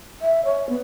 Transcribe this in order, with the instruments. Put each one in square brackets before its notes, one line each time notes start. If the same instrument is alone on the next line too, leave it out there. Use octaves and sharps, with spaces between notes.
[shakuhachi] E5
C#5
B3